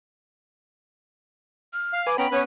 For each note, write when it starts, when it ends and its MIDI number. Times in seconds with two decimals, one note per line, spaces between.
1.73 2.02 89
1.93 2.09 77
2.07 2.17 71
2.07 2.17 80
2.07 2.15 86
2.18 2.27 59
2.18 2.27 61
2.18 2.29 79
2.18 2.27 82
2.18 2.37 83
2.32 2.43 59
2.32 2.43 61
2.32 2.43 71
2.32 2.39 73